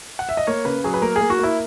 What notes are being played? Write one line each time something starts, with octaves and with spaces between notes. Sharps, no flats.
F#5
E5
D#5
A#3 C#5
C#3 B4
F#3 G#4
B4
A#3 A#4
G#4
A#3
F#4
A#3 E4